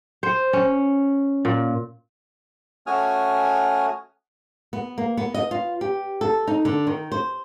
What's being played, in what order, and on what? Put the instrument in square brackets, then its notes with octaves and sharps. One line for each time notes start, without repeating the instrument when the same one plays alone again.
[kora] C5
C#4
A#2
[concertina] A3 C#4 F#4 G#5 D#6 F6
[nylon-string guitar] B3
A#3
B3
D#5
F4
G4
A4
D#4
D3
D#3
C5